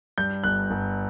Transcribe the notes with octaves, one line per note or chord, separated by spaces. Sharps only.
G2 G6
G1 F#6
G1